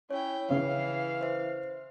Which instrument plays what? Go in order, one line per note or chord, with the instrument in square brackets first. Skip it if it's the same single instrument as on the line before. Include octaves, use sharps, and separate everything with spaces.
[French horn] C#4 [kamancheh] E4 G5 [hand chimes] C#5
[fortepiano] C#3 [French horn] E3 [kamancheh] F5
[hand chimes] C5 E5